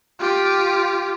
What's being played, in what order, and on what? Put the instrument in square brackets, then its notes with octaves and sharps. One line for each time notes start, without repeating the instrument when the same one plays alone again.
[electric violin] F4 G4